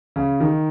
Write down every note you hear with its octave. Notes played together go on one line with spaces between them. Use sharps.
C#3
D#3